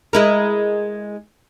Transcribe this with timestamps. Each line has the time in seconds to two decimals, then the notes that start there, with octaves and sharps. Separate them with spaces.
0.13 G#3 E4 A#4